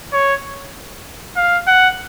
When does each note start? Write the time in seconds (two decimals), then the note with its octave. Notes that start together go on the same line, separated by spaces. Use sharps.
0.13 C#5
1.36 F5
1.67 F#5